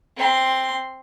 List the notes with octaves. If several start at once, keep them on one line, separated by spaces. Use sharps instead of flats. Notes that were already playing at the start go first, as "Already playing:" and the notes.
C4 C6